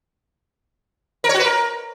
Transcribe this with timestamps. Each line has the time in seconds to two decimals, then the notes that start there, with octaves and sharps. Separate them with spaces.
1.24 A#4
1.29 C#5
1.34 F#4
1.39 B4
1.45 A#4